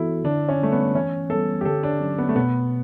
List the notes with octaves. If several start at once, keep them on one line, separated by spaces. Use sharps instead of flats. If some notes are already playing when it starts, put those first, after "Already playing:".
Already playing: E3 B3 E4 F#4 A4
D3 D4
C#4
G3 A3 D4
B3
E3 C#4
G3 B3 A4
G4
D3 A4
D4
F#3 C#4
B3
A3
B2 B3